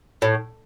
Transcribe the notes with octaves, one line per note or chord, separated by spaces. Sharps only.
A2